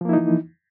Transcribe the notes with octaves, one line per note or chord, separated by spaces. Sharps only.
E3 F3 A#3 D#4 E4